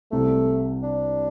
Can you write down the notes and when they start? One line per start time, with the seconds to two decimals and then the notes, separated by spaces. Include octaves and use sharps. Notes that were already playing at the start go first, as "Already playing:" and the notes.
0.11 C2 C3 G3 A3
0.83 D4